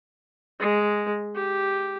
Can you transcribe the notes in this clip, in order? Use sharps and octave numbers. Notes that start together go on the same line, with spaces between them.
G#3
G4